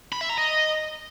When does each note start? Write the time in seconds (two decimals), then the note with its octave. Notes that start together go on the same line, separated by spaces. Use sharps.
0.13 B5
0.21 E5
0.29 A#5
0.38 D#5